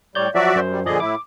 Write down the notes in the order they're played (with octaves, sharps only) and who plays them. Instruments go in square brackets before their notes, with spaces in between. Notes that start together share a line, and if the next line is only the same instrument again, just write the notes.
[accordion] A2 G3 [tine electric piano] C#5 D5 G6
[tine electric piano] F3 F#3 [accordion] F#4 D5 E5
[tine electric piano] F#2 C5
[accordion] G3
[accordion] A#2 D3 G#4 [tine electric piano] F3 D5 D#5
[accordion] A2 E4 [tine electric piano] D6